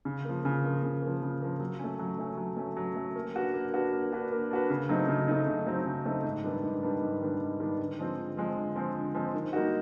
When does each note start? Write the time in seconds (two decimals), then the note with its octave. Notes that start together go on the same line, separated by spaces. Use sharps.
0.05 C#3
0.25 F3 A#3
0.45 C#3
0.64 F3 A#3
0.83 C#3
1.02 F3 A#3
1.22 C#3
1.42 F3 A#3
1.60 F#3
1.79 A3 C#4
1.99 F#3
2.18 A3 C#4
2.37 F#3
2.57 A3 C#4
2.77 F#3
2.96 A3 C#4
3.16 A#3
3.35 D4 F#4 B4
3.54 A#3
3.74 D4 F#4 B4
3.93 A#3
4.12 D4 F#4 B4
4.32 A#3
4.51 D4 F#4 B4
4.70 C#3
4.89 F#3 A3 C4 D#4
5.08 C#3
5.28 F#3 A3 C4 D#4
5.48 C#3
5.67 F#3 A3 C4 D#4
5.86 C#3
6.05 F#3 A3 C4 D#4
6.24 G#2
6.44 D#3 G3 B3 D4
6.63 G#2
6.83 D#3 G3 B3 D4
7.02 G#2
7.22 D#3 G3 B3 D4
7.40 G#2
7.60 D#3 G3 B3 D4
7.79 D3
7.99 F3 G#3 C4
8.18 D3
8.37 F3 G#3 C4
8.57 D3
8.76 F3 G#3 C4
8.96 D3
9.14 F3 G#3 C4
9.35 D#3
9.53 G3 A#3 D#4 F#4